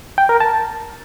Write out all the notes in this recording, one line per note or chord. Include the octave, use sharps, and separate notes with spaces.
G5
A#4
A5